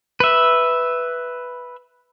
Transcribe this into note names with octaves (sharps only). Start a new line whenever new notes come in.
B4 E5